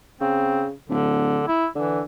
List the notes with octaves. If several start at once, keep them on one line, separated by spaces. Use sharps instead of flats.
C#3 C4
D1 D3
E4
D3 E3